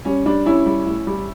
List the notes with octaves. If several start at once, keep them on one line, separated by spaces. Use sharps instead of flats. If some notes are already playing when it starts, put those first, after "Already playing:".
G3 C#4
G3 D4
G3 C#4 E4
G3
A2
G3